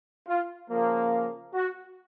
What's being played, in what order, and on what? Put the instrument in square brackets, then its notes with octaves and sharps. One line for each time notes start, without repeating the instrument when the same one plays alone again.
[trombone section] F4
C#3 F3 A#3
F#4